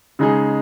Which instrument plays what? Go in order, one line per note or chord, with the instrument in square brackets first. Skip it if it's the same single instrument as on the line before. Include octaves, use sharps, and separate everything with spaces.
[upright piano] C#3 G#3 D#4 G#4